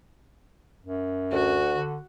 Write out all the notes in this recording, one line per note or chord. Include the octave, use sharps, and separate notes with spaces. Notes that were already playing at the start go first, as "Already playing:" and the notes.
F#2
D2 F#4
D3